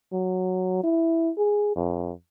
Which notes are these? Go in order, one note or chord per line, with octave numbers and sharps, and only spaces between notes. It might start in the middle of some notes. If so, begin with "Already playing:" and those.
F#3
E4
G#4
F2